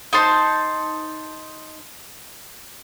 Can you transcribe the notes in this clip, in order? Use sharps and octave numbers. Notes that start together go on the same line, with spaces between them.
D#4 C5 A5 C6